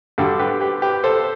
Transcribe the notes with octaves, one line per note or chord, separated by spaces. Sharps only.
G2 D3 G3 F#4 A4
G4 B4
G4 B4
G4 B4
A4 C5